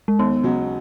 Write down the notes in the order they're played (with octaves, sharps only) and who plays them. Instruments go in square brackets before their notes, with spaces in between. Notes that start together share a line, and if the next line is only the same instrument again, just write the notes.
[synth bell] G#3
[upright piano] D#2 [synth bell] B3
[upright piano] C#3 F#3 D#4